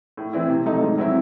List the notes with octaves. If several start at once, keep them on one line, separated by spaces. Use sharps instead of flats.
A2
E3 C4 E4
C3
F#3 A3 D#4
G#2
F#3 C4 E4